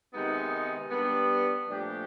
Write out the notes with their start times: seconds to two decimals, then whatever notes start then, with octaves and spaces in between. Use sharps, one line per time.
0.14 C3 D#3 G#3 B3 D#4
0.91 G3 B3 D4
1.68 A#2 F3 A3 D4 G4